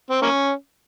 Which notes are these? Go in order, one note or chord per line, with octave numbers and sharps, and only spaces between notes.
C4
A#3 C#4